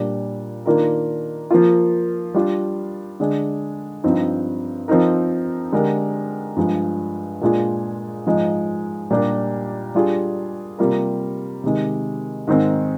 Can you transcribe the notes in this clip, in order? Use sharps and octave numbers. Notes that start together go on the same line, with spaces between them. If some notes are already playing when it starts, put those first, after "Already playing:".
Already playing: A#2 G3 D4
D#3 A#3 D4 F4 A#4
F3 A#3 F4
G3 D4 F4
D3 G#3 D4 G#4
G2 F3 C4 D#4
F3 C4 D#4 A#4
D3 G#3 D4 G4 A#4
G2 F3 G#3
A#2 G#3 D4 F4 G#4
G#2 F3 G#3 D#4
A#2 G3 D4 G4 A#4
G3 D4 F4 G#4
C3 G3 A#3 F4 A#4
C3 D#3 G#3
G#2 D#3 G#3 C4 D#4